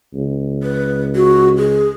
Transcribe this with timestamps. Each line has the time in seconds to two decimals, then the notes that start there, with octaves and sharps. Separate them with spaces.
0.15 C#2
0.63 B4
1.15 F#4
1.57 G#4